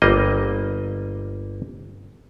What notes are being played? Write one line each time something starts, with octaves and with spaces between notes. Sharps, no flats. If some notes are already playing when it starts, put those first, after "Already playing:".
G1 G3 A#3 D#5